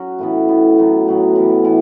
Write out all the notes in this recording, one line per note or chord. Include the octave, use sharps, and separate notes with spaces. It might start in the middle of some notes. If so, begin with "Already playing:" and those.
Already playing: F#3 C#4 F#4
A2 E3 B3
A2 E3 B3
A2 F#3 B3
A2 F#3 B3
A2 E3 B3 E4
A2 E3 B3 E4